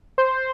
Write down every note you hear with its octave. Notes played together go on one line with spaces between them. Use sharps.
C5